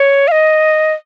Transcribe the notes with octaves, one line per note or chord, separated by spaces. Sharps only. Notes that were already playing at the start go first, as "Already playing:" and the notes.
Already playing: C#5
F5
D#5